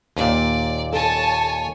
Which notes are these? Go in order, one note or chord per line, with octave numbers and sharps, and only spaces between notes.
D#2 A#2 D5
A4 C#5 G#5 A5